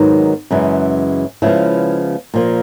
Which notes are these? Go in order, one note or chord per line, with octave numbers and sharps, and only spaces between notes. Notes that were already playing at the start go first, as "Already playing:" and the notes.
Already playing: G#2 D#3 F#3 B3
F#2 C#3 E3 G#3
C#3 F3 G#3 B3 E4
A#2 F3 A#3